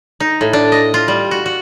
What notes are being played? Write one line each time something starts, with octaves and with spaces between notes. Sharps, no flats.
D#4
A2
D4
D#5
F4
G3
F#4
F#4